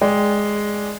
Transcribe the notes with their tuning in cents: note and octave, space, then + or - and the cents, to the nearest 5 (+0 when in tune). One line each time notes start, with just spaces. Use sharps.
G#3 +0 D5 +0 G5 -5